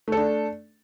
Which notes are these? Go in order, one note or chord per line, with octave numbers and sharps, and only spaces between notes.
A3 D4 A4